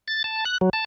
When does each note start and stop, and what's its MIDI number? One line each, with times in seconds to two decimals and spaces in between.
0.08 0.23 93
0.24 0.45 81
0.45 0.58 90
0.61 0.70 54
0.73 0.84 81